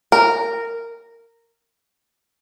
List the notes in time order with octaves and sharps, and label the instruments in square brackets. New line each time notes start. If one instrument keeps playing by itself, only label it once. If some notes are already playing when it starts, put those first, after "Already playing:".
[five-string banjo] A#4